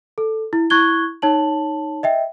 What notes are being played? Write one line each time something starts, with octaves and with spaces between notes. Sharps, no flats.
A4
E4
E4 C#6 F#6 G#6 G7
D#4 C#5 A5 F#7
D#5 E5 G5